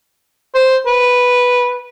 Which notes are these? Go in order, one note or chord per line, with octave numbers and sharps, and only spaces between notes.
C5
B4